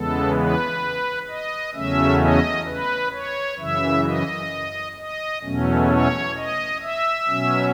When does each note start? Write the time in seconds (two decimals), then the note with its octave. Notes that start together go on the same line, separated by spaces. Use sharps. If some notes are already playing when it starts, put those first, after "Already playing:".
Already playing: E2 C#3 E3 G#3 B3 A4
0.36 B4
1.29 D#5
1.74 E2 C#3 F#3 A3 C#4 E5
2.20 D#5
2.67 B4
3.13 C#5
3.59 F#2 C#3 E3 E5
4.05 D#5
4.97 D#5
5.43 E2 B2 F#3 A3 C#4
5.90 C#5
6.36 D#5
6.82 E5
7.28 B2 F#3 C#4